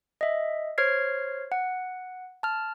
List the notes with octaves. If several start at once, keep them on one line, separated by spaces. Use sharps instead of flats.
D#5 E5
C5 C#5 F6 G#6 C7
F#5
A5 F6